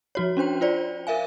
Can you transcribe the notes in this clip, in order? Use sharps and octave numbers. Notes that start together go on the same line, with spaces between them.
F3 F#4 C#5
C#4 D4 C5 G5
F4 C5 D5
A#4 E5 F5 G#5